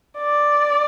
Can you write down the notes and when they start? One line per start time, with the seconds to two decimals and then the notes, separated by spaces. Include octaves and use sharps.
0.18 D5